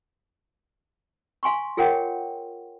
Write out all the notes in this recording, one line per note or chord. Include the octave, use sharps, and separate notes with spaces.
F5 G#5 C6 C#6
F4 G#4 A#4 C#5 F#5 G5